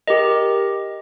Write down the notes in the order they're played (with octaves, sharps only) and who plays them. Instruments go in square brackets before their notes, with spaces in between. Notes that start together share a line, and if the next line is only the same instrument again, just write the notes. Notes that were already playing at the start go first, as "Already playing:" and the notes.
[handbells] G4 A#4 D#5